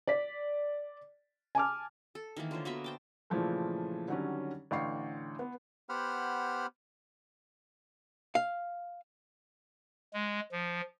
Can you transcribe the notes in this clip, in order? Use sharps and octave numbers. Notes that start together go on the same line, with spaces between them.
D5 B6
G#5 A5 D6 F6
A4
D#3 E3 A3 A#3
D3 F4 C5 C#5
A#3 B3 F#4 E5
C5 G5 A5
A#2 C#3 E3 F3 A3
D3 D#3 F#3 G3 C#4
A1 D3 F5 G5 C#6 C7
B3
B3 G4 C5 F#5 B5 F6
F5
G#3
F3